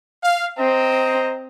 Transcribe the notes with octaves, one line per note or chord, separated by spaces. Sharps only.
F5
C4 C5 D#5 A#5